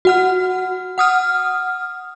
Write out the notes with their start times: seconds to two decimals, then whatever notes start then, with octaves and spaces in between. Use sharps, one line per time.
0.05 F#4 F#5 F6
0.98 F#5 D#6 F6